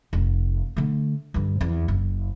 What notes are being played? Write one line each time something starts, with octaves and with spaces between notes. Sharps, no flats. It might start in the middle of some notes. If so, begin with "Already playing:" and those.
F1
D3 A3
G2 D3
E2 C4
F#1